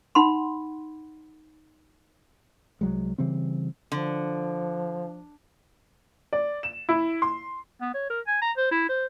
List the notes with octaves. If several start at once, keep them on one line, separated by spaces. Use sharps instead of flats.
D#4 F#5 B5 C6
C2 F#3 G#3
C#3 E3 G3 C4
D3 F3
D5
E7
E4
C6
B3
C#5
A#4
G#5
A#5
C5
E4
C5